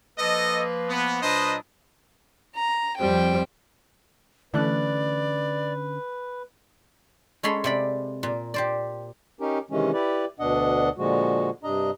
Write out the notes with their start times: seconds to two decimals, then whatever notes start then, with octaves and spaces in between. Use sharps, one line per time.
0.18 F3 A#3 A4 B4 D#5
0.89 B3
1.22 A#2 F#3 D4 B4 C5 D#5
2.55 A#5
2.98 F2 G3 C4 G5
4.54 D3 E3 A3 C#4 B4 D5 F#6
7.43 G#3 C#4 A4 C#5 B5 C6
7.64 C3 D5 B5
8.23 A#2
8.54 G4 C5 D5
9.39 C#4 D#4 G4 A#4
9.71 C3 D#3 E3 G#3 C#4
9.93 E4 G4 B4 D5
10.40 D2 B2 D4 D#5 F#5
10.98 A#2 D3 F3 G#3 F#4
11.63 G2 C3 D4 D#5 A#5